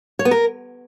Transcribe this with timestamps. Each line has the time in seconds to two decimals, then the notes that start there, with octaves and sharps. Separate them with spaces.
0.19 C#5
0.25 B3
0.31 A#4